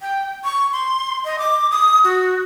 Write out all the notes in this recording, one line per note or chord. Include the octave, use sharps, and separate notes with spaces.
G5
C#6
C6
D#5
D6
D#6
F#4